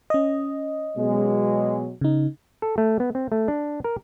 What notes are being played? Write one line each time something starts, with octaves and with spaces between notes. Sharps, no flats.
C#4 D#5
B2 F#3 G#3
C#3 D#4
A4
A3
B3
C4
A3
D4
A#4